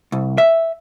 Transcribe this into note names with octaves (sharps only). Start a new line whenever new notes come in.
C2
E5